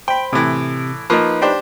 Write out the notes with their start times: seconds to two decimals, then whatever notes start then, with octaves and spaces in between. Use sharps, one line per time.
0.08 C5 G5 B5
0.33 A2 C3 E3
1.10 F3 A#3 D#4 B4
1.42 D4 G4 C5